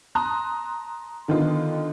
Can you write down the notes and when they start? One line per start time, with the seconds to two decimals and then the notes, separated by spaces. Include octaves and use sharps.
0.15 A5 A#5 C6 D#6 F#6
1.28 D3 D#3 B3 D#4 F4